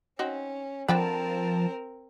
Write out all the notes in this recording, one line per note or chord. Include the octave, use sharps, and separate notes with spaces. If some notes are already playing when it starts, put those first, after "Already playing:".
C4 C#4 D#4 F#4
D3 F3 C4 A#4 G5 A5 B5